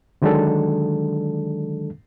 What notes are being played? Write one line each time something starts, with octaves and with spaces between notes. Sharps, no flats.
D3 D#3 F#3 G#3 D4 A4